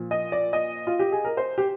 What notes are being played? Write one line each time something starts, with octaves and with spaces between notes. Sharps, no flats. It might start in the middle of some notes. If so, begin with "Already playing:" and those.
Already playing: A#2 F3
D#5
D5
D#5
F4
G4
G#4
A#4
C5
G4